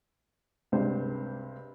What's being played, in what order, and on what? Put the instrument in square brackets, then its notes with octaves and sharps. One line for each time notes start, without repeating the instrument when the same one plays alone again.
[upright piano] C#2 G2 C3 C5